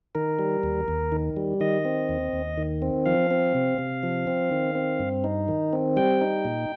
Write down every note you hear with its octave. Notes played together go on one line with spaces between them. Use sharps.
D#3 A#4
G3
D#2
D#2
D#3
G3
D#3 D#5
C4
D#2
D#2
D#3
C4
F3 F5
C4
C3
C3
F3
C4
D#3
C4
G2
D#4
D#3
C4
G3 G5
D#4
A#2